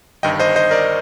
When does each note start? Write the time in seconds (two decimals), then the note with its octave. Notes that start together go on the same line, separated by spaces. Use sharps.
0.23 G1 G2 D#3 D#5 G5
0.39 C5 D#5
0.56 C5 D#5
0.71 A#4 D5